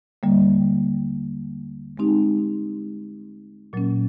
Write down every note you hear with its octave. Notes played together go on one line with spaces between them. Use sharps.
D#2 D3 G3 A#3
G#3 C4 D#4 G4
A#2 F#3 A#3 C#4